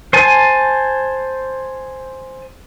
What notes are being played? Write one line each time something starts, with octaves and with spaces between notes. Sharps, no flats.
C5 G#5 A5